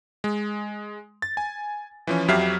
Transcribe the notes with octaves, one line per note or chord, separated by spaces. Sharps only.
G#3
A6
G#5
E3 F3 C#4
F2 F#3 G4 E5 F6 C7